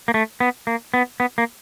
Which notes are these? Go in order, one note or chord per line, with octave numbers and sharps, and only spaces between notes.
A#3
A3
B3
A#3
B3
B3
A#3